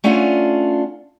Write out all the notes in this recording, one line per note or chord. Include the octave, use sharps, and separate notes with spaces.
A3 C#4 D4 F4 F#5 G#5